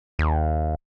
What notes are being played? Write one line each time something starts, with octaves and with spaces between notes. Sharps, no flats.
D#2